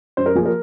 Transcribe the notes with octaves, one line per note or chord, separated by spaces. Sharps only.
F#2 C5
A#4
F3 A#3 G#4
A#4